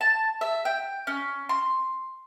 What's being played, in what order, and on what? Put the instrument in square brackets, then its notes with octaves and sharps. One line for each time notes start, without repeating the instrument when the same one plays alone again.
[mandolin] A5
E5
G5
C#4
C6